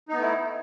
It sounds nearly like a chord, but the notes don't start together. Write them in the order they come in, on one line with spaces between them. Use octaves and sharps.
D#4 B3 A3 E4